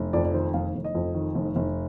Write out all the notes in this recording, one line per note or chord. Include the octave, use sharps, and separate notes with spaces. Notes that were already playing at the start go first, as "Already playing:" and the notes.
Already playing: F1
F2 D5
D5
D#3 C5
F1 F5
F1
D#5
F2
D#3
F1
F1